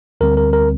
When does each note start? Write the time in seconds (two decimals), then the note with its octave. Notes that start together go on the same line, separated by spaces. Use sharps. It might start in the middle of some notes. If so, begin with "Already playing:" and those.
0.21 D2 D3 G3 C4 A#4
0.37 A#4
0.53 A#4